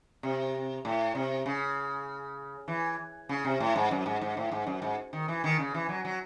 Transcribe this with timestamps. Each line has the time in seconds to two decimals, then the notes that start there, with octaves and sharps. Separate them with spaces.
0.23 C3
0.85 A2
1.15 C3
1.46 C#3
2.68 E3
3.29 C#3
3.45 C3
3.60 A2
3.76 G#2
3.91 F#2
4.06 G#2
4.21 G#2
4.37 A2
4.52 G#2
4.67 F#2
4.82 G#2
5.13 D#3
5.28 E3
5.44 D#3
5.59 C#3
5.74 E3
5.89 F#3
6.05 F#3